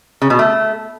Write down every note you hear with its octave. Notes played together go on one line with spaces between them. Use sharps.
C#3
B2
A3